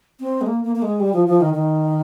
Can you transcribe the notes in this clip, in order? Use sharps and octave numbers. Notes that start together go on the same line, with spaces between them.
C4
G#3
A#3
A#3
A#3
G#3
G3
F3
F3
D#3
D#3